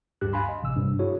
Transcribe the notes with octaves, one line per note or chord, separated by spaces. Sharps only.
D2 G2 G4 F#6
F5 G#5 B5 C6
D#5
A1 C3 E6
G2 C3
E4 F#4 G#4 C#5